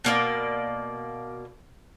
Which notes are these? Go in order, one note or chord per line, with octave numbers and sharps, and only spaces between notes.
B2 A#3 D5